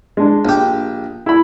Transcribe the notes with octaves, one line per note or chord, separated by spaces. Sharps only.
G#3 D4
A#1 G4
E4 B5